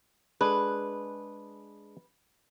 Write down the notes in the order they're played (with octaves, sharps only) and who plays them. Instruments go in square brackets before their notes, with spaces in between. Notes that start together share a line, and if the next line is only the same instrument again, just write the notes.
[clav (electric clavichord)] G#3 D4 G#4 [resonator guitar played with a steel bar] B4